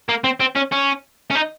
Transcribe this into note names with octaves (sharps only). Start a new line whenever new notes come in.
A#3
C4
C4
C#4
C#4
C#4
D#4